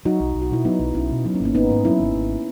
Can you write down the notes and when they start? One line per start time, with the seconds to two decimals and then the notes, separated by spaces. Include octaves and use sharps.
0.05 F#3 D#4 F#4
0.20 B1
0.35 B1
0.42 F#4
0.51 B2 E4
0.65 F#3 B3 D#4
0.79 B1
0.95 B1 C#4 E4
1.10 B2
1.25 F#3 B3 D#4
1.34 A#3 C#4
1.40 G#1
1.45 A#3 C#4
1.55 G#1 B3 D#4
1.70 G#2
1.85 F#3 C#4 E4
2.00 G#1
2.15 G#1